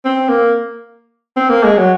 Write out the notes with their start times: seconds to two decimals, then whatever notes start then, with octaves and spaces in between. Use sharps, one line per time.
0.05 C4
0.28 A#3
1.36 C4
1.50 A#3
1.63 G#3
1.77 F#3